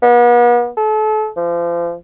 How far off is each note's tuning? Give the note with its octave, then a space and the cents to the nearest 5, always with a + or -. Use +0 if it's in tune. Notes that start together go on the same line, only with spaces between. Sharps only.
B3 -40
A4 -35
F3 -30